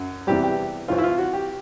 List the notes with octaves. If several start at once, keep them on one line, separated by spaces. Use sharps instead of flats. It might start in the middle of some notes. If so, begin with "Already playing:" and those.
Already playing: F#2
E2 C3 E3 G3 G4
G4
C2 C3 E3 F4
E4
F4
F#4
G4